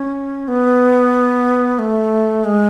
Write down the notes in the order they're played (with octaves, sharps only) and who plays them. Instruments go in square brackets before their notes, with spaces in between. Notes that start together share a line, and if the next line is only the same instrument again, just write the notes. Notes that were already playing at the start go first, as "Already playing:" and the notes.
Already playing: [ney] C#4
B3
A3
G#3